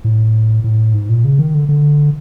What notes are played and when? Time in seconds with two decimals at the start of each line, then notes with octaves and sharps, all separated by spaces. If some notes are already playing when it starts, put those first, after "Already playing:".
0.04 A2
0.64 A2
0.94 G#2
1.09 A#2
1.25 C#3
1.39 D#3
1.55 D3
1.69 D3